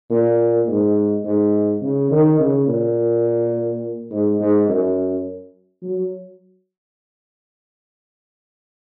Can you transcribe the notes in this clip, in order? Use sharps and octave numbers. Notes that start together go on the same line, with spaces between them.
A#2
G#2
G#2
C#3
D#3
C#3
A#2
G#2
G#2
F#2
F#3